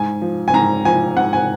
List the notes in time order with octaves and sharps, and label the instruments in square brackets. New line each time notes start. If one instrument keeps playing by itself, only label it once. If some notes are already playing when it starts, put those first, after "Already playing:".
Already playing: [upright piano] G#2 G#5
F3
G#5
G#2 A#5
F3 G#5
G#2 F#5
G#5